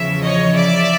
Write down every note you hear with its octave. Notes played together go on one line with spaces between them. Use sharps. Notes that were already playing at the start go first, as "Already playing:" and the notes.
Already playing: E2 C#3 F3 E5
C#5 D#5
D5 E5